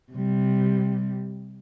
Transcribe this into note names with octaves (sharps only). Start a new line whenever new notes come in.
C3 G3